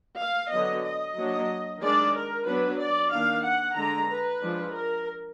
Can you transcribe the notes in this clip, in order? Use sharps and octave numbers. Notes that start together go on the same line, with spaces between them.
F5
D3 F#3 B3 D#5
D#5
F#3 A#3 D4
D#3 G#3 D4 D5
A#4
F#3 B3 D4 B4
D5
D#3 A#3 D4 F5
F#5
D3 G#3 D4 A#5
B4
F3 G#3 D4
A#4